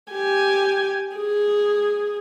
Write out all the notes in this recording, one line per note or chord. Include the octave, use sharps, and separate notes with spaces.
G4 G#5
G#4